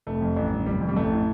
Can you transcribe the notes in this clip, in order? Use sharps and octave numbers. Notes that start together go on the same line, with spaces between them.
F1 A3
F2
A1
G2
F1 G3
F2
G3
A1 A3
A2